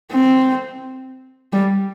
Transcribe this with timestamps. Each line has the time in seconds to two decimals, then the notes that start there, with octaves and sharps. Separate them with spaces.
0.11 C4
1.53 G3